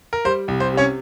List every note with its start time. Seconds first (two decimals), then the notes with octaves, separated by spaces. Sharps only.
0.13 A#4
0.25 G3 C5
0.48 C2
0.60 C5
0.72 C3
0.77 C#4 C#5